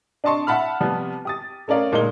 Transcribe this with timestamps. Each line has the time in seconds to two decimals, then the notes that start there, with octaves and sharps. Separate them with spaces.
0.24 D4 D5 D#5 A5 C6 C#6
0.47 E5 F#5 A5 B5 F6
0.80 C3 F3 G3 B3
1.25 G4 D#6 A6
1.68 A3 C#4 A#4 D5 F5
1.92 F#1 A#2 G#3 D#4 A#4 G7